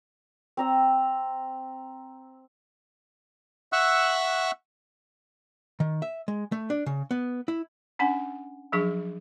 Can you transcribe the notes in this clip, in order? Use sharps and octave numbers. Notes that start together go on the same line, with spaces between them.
C4 A#5 E6
E5 F#5 C#6 E6 F#6
D#3
E5
G#3
A3
D4
C#3
B3
E4
C#4 D4 F#5 G#5
F3 F#3 D4 G#4 C#6